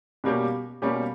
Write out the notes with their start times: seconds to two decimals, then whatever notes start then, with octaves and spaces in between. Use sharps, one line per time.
0.24 B2 G3 A#3 C#4 G4
0.82 B2 G3 A#3 C#4 G4